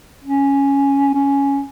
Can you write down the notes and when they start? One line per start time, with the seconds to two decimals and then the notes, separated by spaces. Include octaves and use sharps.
0.24 C#4
1.15 C#4